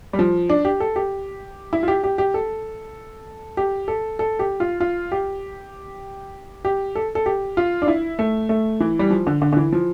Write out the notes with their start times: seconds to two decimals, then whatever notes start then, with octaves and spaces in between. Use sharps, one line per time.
0.13 G3
0.19 F3
0.49 D4
0.65 G4
0.80 A4
0.96 G4
1.73 E4
1.83 F4
1.88 G4
2.04 G4
2.18 G4
2.34 A4
3.57 G4
3.88 A4
4.19 A4
4.39 G4
4.60 F4
4.80 F4
5.12 G4
6.65 G4
6.95 A4
7.15 A4
7.26 G4
7.57 F4
7.82 D4
7.88 E4
8.19 A3
8.49 A3
8.80 E3
8.99 G3
9.10 F3
9.27 D3
9.42 D3
9.53 D3
9.57 E3
9.72 F3